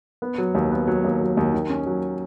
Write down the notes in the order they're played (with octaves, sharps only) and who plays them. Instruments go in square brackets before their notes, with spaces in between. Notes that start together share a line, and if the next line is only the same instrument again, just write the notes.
[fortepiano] B3
F#3
D#2
B3
F#3
D#2
F#3
D#2
D#3
C#4
F#3